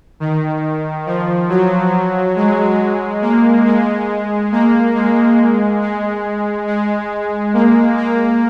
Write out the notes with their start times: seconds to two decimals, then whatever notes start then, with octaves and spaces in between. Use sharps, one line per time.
0.20 D#3
1.06 F3
1.49 F#3
2.36 G#3
3.22 A#3
3.66 G#3
4.52 A#3
4.95 G#3
5.82 G#3
6.67 G#3
7.54 A#3
7.97 A#3